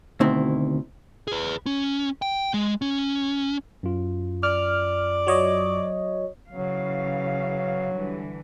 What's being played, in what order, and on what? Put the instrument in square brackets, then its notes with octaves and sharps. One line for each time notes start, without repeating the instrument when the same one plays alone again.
[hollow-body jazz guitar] D2 B2 D#3 C4 E4
[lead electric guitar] G#4 B4
C#4
G5
G#3
C#4
[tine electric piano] F#2 F4
[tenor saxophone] D5 [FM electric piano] F6
[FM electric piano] F#3 C#5 D#5
[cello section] C#3 E3 F5 [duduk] F#3
[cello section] D3 E3 G3